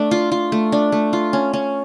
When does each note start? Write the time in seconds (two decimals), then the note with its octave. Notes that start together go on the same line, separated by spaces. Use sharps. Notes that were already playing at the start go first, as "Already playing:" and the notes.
Already playing: A3 D4
0.11 F4
0.32 F4
0.52 A3
0.72 D4
0.92 A3
1.13 F4
1.33 C#4
1.53 C#4